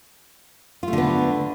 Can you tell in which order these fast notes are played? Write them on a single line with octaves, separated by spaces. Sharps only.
F4 A3 D3 B3